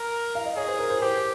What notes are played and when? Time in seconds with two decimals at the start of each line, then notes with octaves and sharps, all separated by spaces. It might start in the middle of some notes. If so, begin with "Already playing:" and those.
Already playing: A#4
0.35 F5
0.46 D#5
0.56 G#4 C#5
0.68 C5
0.79 A#4
0.90 C5
1.01 G4 C5